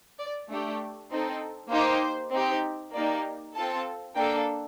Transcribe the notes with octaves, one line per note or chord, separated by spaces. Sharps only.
D5
A3 D4 G4
C4 D#4 A4
A#3 D#4 G4 C5
C4 D#4 G4
A#3 D#4 G4 D5
C4 F4 A4 A5
A#3 D4 A4 G5